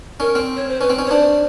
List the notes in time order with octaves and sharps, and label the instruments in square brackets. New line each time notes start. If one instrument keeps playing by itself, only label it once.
[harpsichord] C#4 [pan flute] A#4
[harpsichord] C4
[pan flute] C#5
C5
[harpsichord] C#4 [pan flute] B4
[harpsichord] C4
C#4
[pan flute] C#5
[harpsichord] D4 [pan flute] C5